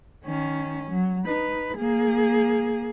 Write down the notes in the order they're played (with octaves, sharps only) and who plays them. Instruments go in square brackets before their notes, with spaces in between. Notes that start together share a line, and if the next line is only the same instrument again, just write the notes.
[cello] D#3 C#4
F#3
D#4 B4
A#3 G#4